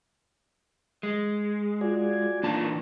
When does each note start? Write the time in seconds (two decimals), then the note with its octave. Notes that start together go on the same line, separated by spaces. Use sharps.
1.03 G#3
1.81 F4 F#4 D5 G#5
2.43 A#2 D#3 E3 D4 A5